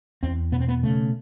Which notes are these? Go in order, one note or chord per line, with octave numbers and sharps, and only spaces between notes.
E2 C4
B2 B3
C4
B3
C#3 A3